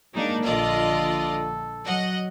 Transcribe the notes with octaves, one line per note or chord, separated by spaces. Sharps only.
F#3 G#3 A#3 D4 D#4
A#1 D3 F4 A4 D5 D#5
F#3 D#5 F#5